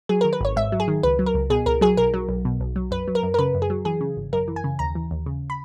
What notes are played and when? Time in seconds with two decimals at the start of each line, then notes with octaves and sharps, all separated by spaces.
0.09 F#3 G#4
0.21 A#4
0.25 D#3
0.33 B4
0.41 G#1 C#5
0.56 G#2 E5
0.72 F#3
0.80 G#4
0.88 D#3
1.03 C#2 B4
1.19 F#3
1.26 A#4
1.34 C#2
1.50 B2 G#4
1.66 C#2 A#4
1.81 F#3 G#4
1.97 B1 A#4
2.14 F#3
2.29 B1
2.45 B2
2.61 B1
2.76 F#3
2.91 F#2 B4
3.08 F#3
3.15 A#4
3.23 F#2
3.34 A#4
3.39 C#3 B4
3.55 F#2
3.62 G#4
3.70 F#3
3.85 E3 G#4
4.01 C#3
4.17 G#1
4.33 F#2 A#4
4.48 E3
4.56 G#5
4.64 C#3
4.79 D#2 A#5
4.95 E3
5.11 D#2
5.26 C#3
5.50 B5